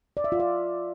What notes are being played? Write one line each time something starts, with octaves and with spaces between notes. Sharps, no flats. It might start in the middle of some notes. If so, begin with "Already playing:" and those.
D5
E5
F4
D5